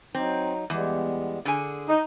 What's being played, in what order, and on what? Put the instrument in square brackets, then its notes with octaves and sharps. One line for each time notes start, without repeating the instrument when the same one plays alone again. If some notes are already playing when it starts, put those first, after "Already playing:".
[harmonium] F#3 D#4 [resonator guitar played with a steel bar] C4
[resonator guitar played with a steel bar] E2 [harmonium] G3 G#3 B3
[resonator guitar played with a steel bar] D3 G#5 [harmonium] G#4
[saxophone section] D#4